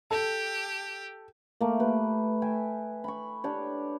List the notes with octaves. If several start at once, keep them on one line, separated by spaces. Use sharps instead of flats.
G4 A4
A3 A#3
G4 B4
E5 G5 G#5
B5 C#6
D4 G4 C#5